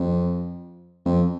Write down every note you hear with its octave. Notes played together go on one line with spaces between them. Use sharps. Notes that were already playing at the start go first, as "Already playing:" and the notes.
Already playing: F2
F2